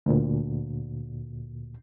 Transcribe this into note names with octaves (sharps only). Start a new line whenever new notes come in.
D2 A#2